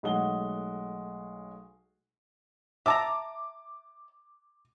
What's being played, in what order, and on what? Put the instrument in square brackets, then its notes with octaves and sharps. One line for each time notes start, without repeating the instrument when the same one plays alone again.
[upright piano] B1 G#3 A3 F#5 G7
[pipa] E5 A5 A#5 [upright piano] D6